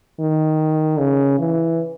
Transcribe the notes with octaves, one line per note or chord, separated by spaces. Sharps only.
D#3
C#3
E3